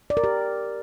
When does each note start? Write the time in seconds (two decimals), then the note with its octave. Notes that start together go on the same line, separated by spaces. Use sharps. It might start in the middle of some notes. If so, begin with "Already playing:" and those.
0.10 D5
0.17 A#4
0.24 G4